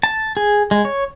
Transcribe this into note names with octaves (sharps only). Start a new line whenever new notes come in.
A5
G#4
G#3
C#5